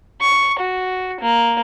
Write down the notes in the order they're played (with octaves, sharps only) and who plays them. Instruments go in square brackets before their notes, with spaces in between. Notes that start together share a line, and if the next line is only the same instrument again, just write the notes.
[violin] C#6
F#4
A#3